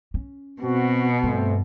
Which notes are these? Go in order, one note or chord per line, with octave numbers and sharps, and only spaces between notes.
C#4
B2 C4 F#4
G2 A3 C4